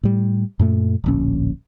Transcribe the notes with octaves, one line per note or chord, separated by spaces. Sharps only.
A2 G3
F#2 A#2 A3
D1 A#1 C#4